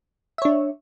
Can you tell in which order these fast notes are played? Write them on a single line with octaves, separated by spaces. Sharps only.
E5 C#5 D4